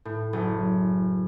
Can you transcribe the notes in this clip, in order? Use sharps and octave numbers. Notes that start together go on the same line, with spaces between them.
A2
F#1